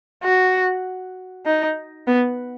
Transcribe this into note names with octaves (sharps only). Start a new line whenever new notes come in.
F#4
D#4
B3